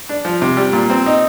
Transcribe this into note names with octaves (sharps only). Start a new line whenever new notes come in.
D4
F3
C3
G3
A#2
C4
D#4